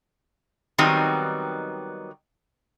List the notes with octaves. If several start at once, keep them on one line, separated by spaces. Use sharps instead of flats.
D#3 F#3 G3 B3 C4 D#4